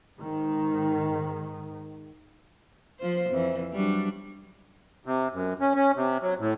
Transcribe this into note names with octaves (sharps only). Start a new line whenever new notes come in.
G#2 D#3
F3 F4 C5
F2 E3
F#3 G3 D4
C3
F#2
C#4
C#4
C3
F#3
A2